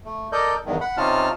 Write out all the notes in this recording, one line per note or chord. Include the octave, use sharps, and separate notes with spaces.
A3
A4 A#4 D5 D#5 G6
E2 G2 D#3
F#5 B5
C3 C#4 D#4 F4 A5 F6